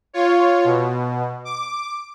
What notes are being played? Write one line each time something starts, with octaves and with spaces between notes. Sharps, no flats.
F4 C#5
B2
D6